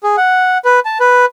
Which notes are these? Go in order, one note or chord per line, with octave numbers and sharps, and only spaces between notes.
G#4
F#5
B4
A5
B4